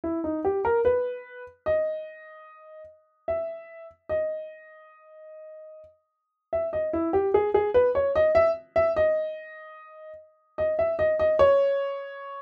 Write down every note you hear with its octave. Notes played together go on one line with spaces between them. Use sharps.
E4
D#4
G4
A#4
B4
D#5
E5
D#5
E5
D#5
E4
G4
G#4
G#4
B4
C#5
D#5
E5
E5
D#5
D#5
E5
D#5
D#5
C#5